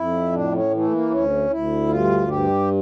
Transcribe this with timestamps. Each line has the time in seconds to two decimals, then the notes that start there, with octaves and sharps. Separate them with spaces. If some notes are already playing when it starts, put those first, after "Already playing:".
Already playing: F2 E4
0.32 A2 D4
0.52 C#4
0.71 E3 A3
0.92 A#3
1.10 D2 C#4
1.50 D2 E4
1.88 G2 F4
2.28 G2 G4